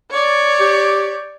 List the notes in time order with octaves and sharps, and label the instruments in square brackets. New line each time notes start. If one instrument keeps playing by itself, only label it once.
[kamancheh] C#5 D5
[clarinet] G4